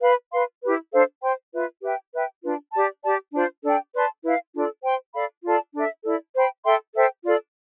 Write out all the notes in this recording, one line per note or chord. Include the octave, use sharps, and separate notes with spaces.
B4 F5 B5
B4 F5 C6
E4 G4 B4
D4 A4 C5 F5
C5 G5 C6
F4 B4 E5
G4 B4 E5 G5
B4 E5 G5
D4 F4 B4
G4 D5 A5
G4 D5 A5
D4 F4 C5
D4 A4 D5 G5
B4 D5 A5 C6
E4 B4 F5
D4 F4 A4 D5
C5 G5 C6
A4 D5 F5 B5
F4 A4 D5 A5
D4 A4 E5
E4 A4 D5
C5 G5 B5
A4 E5 G5 C6
A4 C5 E5 G5
F4 A4 D5